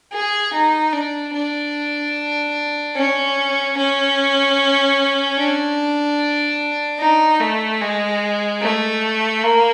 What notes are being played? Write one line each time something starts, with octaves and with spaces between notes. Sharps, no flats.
G#4
D#4
D4
D4
C#4
C#4
D4
D#4
A3
G#3
A3
A#3